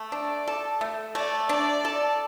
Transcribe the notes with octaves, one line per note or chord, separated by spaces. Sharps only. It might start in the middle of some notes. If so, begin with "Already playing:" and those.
Already playing: A3
D4 D5
A4
A3
A3 D5
D4 D5
A4